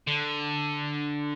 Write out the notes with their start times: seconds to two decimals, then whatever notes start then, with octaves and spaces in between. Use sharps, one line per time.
0.07 D3